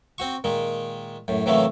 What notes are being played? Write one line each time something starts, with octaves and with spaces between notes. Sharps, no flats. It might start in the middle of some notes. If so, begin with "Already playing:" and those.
C4 F#4 C#6
A#2 D#3 G#3
F#2 A2
A2 C3 E3 F#3 A3 A#3